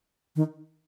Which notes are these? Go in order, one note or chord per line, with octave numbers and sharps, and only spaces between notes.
D#3